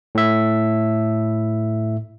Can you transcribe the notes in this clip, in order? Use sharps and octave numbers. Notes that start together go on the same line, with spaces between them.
A2 E5